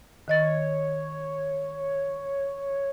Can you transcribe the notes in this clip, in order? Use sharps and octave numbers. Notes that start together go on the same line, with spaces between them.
D#3 C#5 D#5 A6